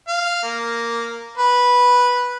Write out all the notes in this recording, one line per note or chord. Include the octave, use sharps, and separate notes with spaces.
F5
A#3
B4